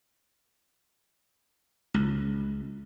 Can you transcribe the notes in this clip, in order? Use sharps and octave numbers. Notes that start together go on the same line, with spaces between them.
C#2